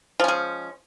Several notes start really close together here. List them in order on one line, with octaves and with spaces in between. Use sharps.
F3 C#4 G#3